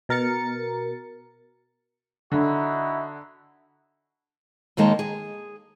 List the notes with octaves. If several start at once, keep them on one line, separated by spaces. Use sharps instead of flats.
B2 A#4 A6 C#7
D3 D#4 E4 F#4
D#2 D#3 G#3 A#3 D#4 A5
G#4